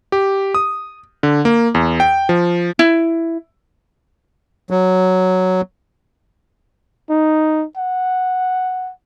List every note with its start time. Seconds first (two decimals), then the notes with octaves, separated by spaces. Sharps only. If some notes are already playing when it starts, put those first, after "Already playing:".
0.12 G4
0.55 D#6
1.23 D3
1.45 A#3
1.75 E2
2.00 G5
2.29 F3
2.79 E4
4.71 F#3
7.10 D#4
7.77 F#5